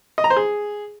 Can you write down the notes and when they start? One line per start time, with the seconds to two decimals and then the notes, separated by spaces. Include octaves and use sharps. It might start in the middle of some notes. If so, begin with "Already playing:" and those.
0.18 D#5
0.24 A#5
0.30 C5
0.37 G#4